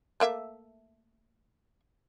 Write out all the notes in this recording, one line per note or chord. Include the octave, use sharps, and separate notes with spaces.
A3 A#3 E5